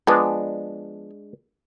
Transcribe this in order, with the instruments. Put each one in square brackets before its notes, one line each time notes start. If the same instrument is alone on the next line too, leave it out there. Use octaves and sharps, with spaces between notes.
[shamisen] F3 B3 [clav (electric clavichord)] G#3 D4